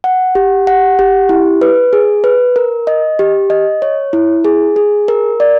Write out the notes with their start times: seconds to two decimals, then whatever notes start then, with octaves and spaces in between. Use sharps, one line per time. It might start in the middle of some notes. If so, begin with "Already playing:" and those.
0.04 F#5
0.35 G4
0.67 F#5
0.99 G4
1.29 E4
1.61 B4
1.93 G#4
2.24 B4
2.56 A#4
2.87 D#5
3.19 G4
3.50 D#5
3.82 C#5
4.13 E4
4.45 G#4
4.76 G#4
5.08 A#4
5.40 D5